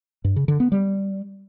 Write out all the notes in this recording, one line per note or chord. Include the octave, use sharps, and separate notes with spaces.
G2
C#3
D3
B3
G3